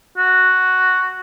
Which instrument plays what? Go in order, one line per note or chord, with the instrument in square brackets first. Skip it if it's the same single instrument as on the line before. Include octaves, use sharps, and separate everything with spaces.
[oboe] F#4